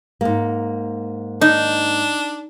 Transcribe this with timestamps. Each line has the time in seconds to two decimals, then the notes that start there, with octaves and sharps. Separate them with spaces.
0.21 G#2 A#3
1.41 D4 D#4